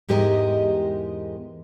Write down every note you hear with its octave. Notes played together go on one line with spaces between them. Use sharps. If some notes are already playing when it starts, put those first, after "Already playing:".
E2 G#2 G#3 G4 A#4 D#5